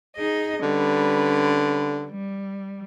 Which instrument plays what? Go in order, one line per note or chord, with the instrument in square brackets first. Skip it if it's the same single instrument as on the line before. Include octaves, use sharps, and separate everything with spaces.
[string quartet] D#4 G#4 D#5
[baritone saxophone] D3 [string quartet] G3 C#4 B4
[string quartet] G3